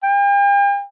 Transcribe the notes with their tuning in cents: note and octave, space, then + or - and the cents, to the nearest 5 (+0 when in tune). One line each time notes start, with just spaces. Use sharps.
G5 +45